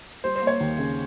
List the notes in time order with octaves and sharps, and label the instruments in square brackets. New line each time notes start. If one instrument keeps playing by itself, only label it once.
[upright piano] G3 [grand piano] C5
[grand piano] C5
[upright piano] A#3
[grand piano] C#5
[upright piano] D#2
C#3